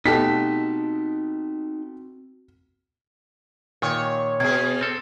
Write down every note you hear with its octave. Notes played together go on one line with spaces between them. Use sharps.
B2 A3 C4 D#4 F#4 G4 A5 B6
A#2 D#3 C#5
B2 G#4 G#6
C4 A4